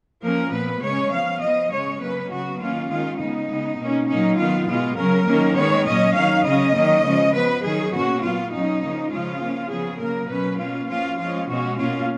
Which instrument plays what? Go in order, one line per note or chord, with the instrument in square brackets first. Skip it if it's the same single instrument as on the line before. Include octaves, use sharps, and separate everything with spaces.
[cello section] F3 A#3 C#4 A#4
A#2 F3 B3 B4
C#3 G#3 C#4 C#5
F3 B3 F5
F3 B3 D#5
C#3 G#3 C#4 C#5
C#3 F#3 A#3 C#4 B4
C#3 F#3 B3 F#4
D#3 A#3 C#4 F4
D#3 G#3 C#4 F4
C#3 G#3 B3 D#4
C#3 G#3 B3
B2 A#3 C#4
A#2 F#3 A#3 C#4 D#4
D#3 F#3 B3 F4
B2 G#3 B3 F4
C#3 F#3 C#4 A#4
D#3 F#3 A#3 C#4
D#3 G#3 B3 C#5
A#2 F#3 C#4 D#5
D#3 F#3 C#4 F5
C#3 F#3 C#4 D#5
D#3 F#3 A#3 C#4
C#3 F3 G#3 C#4
F3 B3 B4
D#3 F#3 C#4 G#4
B2 A#3 C#4 F#4
A#2 F#3 B3 F4
B2 F#3 C#4 D#4
C#3 F3 A#3 C#4
C#3 F3 G#3 C#4 F4
F3 A#3 C#4
C#3 F3 B3 G#4
C#3 F#3 A#3 A#4
B2 F#3 C#4 B4
B2 A#3 C#4 F4
F3 A#3 C#4 F4
F3 G#3 C#4 F4
B2 G#3 C#4 F#4
B2 A#3 C#4 F4